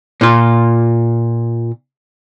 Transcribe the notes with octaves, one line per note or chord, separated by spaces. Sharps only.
A#2 F4